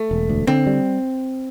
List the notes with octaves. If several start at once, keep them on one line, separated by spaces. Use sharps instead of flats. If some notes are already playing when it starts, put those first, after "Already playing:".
Already playing: A3
E1
D2
D3 C4
G3